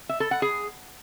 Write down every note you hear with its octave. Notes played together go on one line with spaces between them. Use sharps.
E5
A4
F#5
G#4